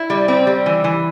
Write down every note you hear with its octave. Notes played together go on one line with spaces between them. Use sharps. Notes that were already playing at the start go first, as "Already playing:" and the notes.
Already playing: E4
G3
C4
G3
E3
E3